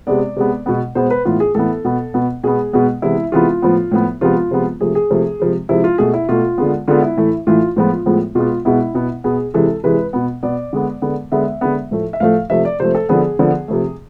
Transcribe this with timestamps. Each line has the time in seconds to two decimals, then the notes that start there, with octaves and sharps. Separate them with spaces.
0.07 C3 G#3 B3 D5
0.36 C3 G#3 B3
0.66 B2 G#3 B3
0.95 B2 G#3 B3 C5
1.11 B4
1.25 A2 E3 B3 F4
1.40 G#4
1.55 A2 E3 B3 A4
1.85 B2 B3
2.14 B2 B3
2.43 B2 G#3 B3 G#4
2.73 B2 G#3 B3
3.02 C3 E3 G#3 B3 E4
3.32 C3 E3 G#3 B3 F4
3.62 A2 F3 B3
3.91 A2 F3 B3
4.21 C3 F3 G#3 B3 F4
4.51 C3 F3 G#3 B3
4.81 C3 F3 A3 G#4
4.95 G#4
5.10 C3 F3 A3
5.40 C3 F3 G#3
5.69 C3 F3 G#3 E4
5.84 F4
5.98 B2 A3 G#4
6.14 E4
6.29 B2 A3 F4
6.58 D3 G#3 B3
6.88 D3 G#3 B3 F4
7.02 E4
7.17 A2 E3 A3
7.47 A2 E3 A3 F4
7.76 A2 F3 G#3 B3 F4
8.06 A2 F3 G#3 B3
8.35 B2 G#3 B3 F4
8.65 B2 G#3 B3 E4
8.95 B2 B3
9.24 B2 B3 G#4
9.54 C3 E3 G#3 A4
9.83 C3 E3 G#3 B4
10.13 B2 B3
10.43 B2 B3 D5
10.73 D3 G#3 B3
11.02 D3 G#3 B3
11.32 D3 G#3 B3 E5
11.61 D3 G#3 B3
11.91 A2 F3 A3
12.13 E5
12.20 A2 F3 A3 F5
12.50 C3 F3 A3 E5
12.65 D5
12.80 C3 F3 A3 C5
12.95 A4
13.09 D3 F3 B3 G#4
13.39 D3 F3 B3
13.68 C3 F3 A3